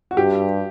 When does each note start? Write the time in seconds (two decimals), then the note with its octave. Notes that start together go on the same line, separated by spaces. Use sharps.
0.11 F#4
0.17 G2 G4